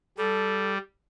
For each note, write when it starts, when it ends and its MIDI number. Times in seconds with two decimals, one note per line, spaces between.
0.18 0.78 55
0.18 0.73 69